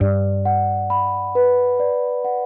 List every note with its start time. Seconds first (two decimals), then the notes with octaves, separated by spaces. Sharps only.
0.01 G2 D5
0.45 F#5
0.90 B5
1.35 B4
1.80 D5
2.24 F#5